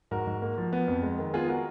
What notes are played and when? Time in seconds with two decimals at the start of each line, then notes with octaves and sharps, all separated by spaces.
0.11 G#2 F#4 A#4
0.27 G#2
0.42 A#3
0.58 F3
0.73 B3
0.88 F2
1.03 G#3
1.19 D#3
1.34 B3 F4 G#4
1.49 F#4 A#4